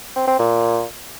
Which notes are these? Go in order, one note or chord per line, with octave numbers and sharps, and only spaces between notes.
C4
C4
A#2